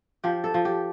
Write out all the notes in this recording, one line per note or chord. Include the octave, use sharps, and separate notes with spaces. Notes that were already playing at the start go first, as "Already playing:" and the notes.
F3 G4
A4
F3
G4